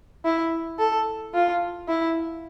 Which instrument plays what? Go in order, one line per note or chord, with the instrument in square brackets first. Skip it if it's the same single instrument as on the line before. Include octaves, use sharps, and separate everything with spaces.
[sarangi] E4
A4
F4
E4